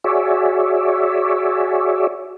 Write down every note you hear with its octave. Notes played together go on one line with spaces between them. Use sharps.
F#4 G#4 C#5 D5 E5